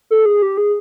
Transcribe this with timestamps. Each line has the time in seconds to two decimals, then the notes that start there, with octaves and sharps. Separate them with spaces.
0.11 A4
0.26 G#4
0.42 G4
0.57 G#4